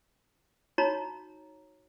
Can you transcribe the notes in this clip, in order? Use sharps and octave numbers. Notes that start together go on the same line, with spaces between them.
D#4 F#4 C#5 A#5